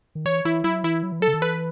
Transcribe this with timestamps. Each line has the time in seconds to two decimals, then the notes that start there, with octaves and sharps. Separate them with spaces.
0.15 D#3
0.25 E3 C#5
0.45 E3 E4
0.64 F#3 E4
0.84 E3 E4
1.03 F#3
1.12 E3
1.20 F#3 A4
1.28 C#3
1.34 D#3
1.41 E3 B4